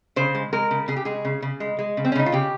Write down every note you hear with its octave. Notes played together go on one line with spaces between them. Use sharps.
C#3 C5
G#3
G#3 A#4
C#3
C#3 G#4
G4
G#3 G#4
C#3
C#3
G#3
G#3
C#3
C4
C#4
C#3 D#4
F4
C#3 G4